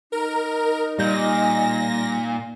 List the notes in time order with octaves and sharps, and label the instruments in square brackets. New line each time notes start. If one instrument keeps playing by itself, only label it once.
[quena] D#4 [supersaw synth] A#4
[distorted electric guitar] A#2 [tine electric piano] G3 G6 [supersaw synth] A#6